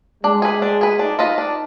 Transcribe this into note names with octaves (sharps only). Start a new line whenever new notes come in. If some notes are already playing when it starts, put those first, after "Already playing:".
G#3 D4
G#4 B4
D4
G#4 B4
D4 D#4
F4 B4 D#5
D4